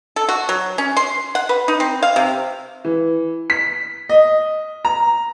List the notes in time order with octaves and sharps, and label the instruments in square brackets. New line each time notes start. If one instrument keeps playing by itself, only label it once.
[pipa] A4
F#4
F#3
C#4
C6
F#5
B4
D#4
C4
F5
C3
[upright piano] E3
B6
D#5
A#5